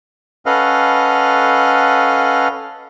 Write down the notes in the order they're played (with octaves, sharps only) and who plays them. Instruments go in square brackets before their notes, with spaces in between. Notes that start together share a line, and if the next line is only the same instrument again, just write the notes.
[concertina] C#4 A4 B4 D#5 F5 F#5